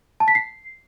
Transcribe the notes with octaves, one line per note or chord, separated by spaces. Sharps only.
A5
B6
C7